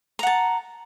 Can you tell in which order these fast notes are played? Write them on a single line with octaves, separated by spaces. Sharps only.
A#5 F#5 A5